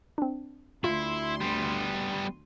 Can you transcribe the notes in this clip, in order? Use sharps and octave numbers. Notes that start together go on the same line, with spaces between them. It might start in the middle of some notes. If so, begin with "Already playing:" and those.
C4 D4
D2 E4 F4 C6
G3 B3